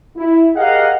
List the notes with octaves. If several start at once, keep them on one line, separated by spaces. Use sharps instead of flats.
E4
G4 G#4 A#4 D#5 F5 F#5